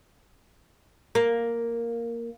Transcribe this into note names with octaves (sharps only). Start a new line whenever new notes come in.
A#3